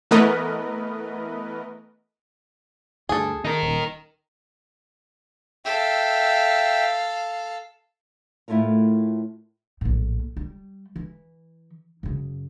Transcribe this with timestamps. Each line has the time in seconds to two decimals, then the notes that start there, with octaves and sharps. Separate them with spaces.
0.11 E3 A3 B3 A#4 B4 D#5
3.09 D2 G2 G#4 A4
3.45 D#3 D#4 A#4
3.62 D#1
5.65 A4 E5 F5 G5
8.48 A2 A3 E4 F4 A4 A#4
9.81 A#1 A2
10.37 G3
10.96 E3
12.03 F#2 C#3